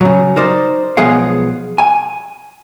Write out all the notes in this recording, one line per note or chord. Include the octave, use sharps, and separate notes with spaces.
C#3 F#3
D#4 A#4 C5 D5
B1 F3 G#3 B3 G#4 F5
G#5